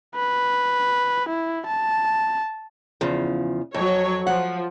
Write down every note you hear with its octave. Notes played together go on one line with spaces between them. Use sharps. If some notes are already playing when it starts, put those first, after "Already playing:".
B4
E4
A5
E2 C#3 F3
F2 F#3 C#5
F3 F#5